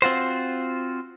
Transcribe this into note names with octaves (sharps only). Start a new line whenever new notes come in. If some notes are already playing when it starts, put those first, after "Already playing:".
C4 F4 F#4 C5